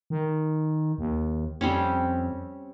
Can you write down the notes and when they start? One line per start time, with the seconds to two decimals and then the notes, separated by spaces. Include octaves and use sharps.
0.10 D#3
0.98 D#2
1.61 F2 G3 C4 C#4